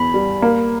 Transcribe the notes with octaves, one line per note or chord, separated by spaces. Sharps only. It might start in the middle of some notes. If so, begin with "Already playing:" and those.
Already playing: E2 B5
G3
A#3